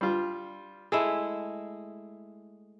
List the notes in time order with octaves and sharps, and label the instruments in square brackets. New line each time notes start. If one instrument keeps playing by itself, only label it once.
[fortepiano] G3 D4 F4
[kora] G#3 A3 E4 [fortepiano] G#4